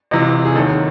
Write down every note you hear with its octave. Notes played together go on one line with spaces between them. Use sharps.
C#2 C3 E3 D#5
G#4
D#2 D#3 F#3 A4